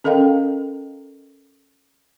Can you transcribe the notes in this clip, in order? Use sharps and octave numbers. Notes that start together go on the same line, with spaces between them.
C#4 A4 A#4 D#5 F5 G5